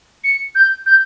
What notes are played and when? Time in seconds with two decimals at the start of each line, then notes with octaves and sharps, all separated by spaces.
0.24 C#7
0.55 G6
0.86 G6